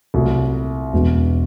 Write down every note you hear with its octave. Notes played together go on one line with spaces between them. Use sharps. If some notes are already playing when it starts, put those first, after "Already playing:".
C2 A#2 F#3 A3
E1 E2 B2 G#3